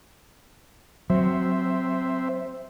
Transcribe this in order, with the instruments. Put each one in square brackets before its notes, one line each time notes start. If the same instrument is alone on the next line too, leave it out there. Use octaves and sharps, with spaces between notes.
[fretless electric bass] F#3 [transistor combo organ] C4 C5 E5